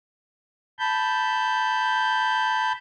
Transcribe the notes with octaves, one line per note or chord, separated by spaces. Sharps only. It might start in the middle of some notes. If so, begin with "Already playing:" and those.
A5 B5 G6